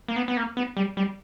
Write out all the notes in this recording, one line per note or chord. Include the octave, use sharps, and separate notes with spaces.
A#3
B3
B3
A#3
B3
G3
G3